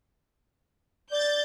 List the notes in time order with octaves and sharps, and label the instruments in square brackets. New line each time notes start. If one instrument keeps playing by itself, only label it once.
[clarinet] D5 [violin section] G6 A6